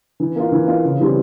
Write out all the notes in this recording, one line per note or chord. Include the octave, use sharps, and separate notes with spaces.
E3
A#3 F4
E3
A#3 F4
C#3
E3 G3 C4